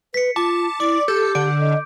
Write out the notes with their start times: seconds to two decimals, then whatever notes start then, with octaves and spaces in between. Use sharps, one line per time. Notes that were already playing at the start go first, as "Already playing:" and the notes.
0.14 B4 B6 C#7
0.36 F4 A5 D6
0.80 E4 D5 D6
1.08 G4 A4 G6
1.35 D3 D7
1.60 D#5